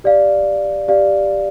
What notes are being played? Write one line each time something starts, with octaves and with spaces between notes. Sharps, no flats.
G4 D5 F5
G4 D5 F5